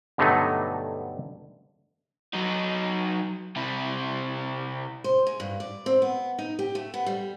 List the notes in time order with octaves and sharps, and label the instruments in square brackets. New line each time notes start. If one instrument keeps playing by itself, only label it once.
[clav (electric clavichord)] G2 B2 D3 F#3 A3 D#4
[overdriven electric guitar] F#3 D#4
C3 E4
[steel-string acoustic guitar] C5
G#3
G2
D5
C4
B3
D#4
G4
A3
B3
G3